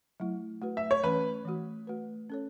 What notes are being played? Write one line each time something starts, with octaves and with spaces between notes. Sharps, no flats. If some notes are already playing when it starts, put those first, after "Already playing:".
F#3 A3 E4
A3 F#4 B4
E5
C#5
E3 A3 C#4 B4
E3 A3 F#4
A3 F#4 B4
C#4 A4 C#5